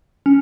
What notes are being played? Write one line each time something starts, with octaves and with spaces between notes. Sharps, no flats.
C#4